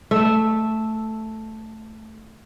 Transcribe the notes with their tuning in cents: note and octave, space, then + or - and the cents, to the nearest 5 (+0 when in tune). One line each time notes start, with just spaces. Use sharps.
A3 +0 E5 -5